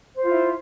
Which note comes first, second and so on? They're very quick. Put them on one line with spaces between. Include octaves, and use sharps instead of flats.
C5 F4 E4